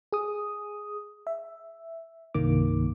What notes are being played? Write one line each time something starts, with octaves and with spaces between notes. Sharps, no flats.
G#4 D#6
E5
C2 G2 D#3 A#3 D6